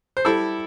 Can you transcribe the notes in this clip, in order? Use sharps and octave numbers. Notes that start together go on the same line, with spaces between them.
C5
G3 E4 A4